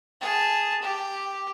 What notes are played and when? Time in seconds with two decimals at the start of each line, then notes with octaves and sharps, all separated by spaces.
0.21 G#4 A5
0.82 G4